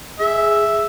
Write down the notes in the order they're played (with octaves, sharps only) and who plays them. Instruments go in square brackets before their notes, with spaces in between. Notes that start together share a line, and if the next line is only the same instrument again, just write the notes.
[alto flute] G#4 [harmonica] E5